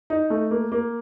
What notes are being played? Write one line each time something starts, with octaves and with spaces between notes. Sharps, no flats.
D#4
A3
A#3
A#3